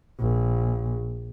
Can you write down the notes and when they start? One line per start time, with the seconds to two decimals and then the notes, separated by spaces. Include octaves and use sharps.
0.20 A#1